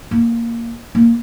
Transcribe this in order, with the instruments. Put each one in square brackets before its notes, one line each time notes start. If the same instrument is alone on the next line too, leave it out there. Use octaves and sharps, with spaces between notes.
[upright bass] A#3
A#3